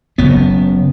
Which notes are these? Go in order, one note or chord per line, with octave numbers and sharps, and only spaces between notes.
F#1 F#2 C#3 B3